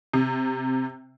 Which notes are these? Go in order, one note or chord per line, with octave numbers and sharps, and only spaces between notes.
C3